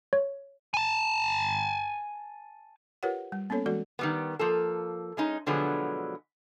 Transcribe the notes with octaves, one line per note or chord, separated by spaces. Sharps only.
C#5
G#5 A5
F4 G4 A#4 B4 C#5 F#5
G3
A#3 B3 C#4 A4 C#5
E3 G#3 F#4 A4 D5
D#3 G3 B3
F3 A#3 A4
G#3 C#4 D#4
B2 D3 F3 F#3 G#3 B3